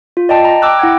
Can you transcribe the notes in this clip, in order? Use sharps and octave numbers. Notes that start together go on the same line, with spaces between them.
F4
D5 D#5 G5 A5
A#5
G5 D6 E6 F#6
E4 F#5 G5 G#6